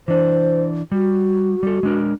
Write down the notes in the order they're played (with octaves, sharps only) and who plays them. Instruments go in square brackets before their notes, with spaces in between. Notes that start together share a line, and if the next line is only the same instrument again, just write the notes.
[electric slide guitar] E3 D4 [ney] C5
[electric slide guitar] G3 [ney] F#4
[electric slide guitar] G3 A4
G#3 D4 A#4